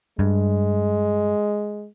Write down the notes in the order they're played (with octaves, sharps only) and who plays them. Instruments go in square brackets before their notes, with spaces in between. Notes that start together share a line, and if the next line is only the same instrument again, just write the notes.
[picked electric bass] G2 [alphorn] G#3